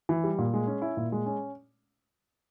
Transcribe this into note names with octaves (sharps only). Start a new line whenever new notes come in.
E3
G3
A#2
G#3
C#4
E4
A#2
G#3
C#4